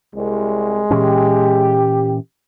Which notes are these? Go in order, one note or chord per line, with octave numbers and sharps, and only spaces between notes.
C2 G#3
A#2 E3 C#4 G4